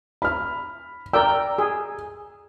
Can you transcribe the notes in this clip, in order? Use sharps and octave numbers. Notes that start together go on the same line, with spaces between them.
B5 F6
A#4 D5 G5 E6
G#4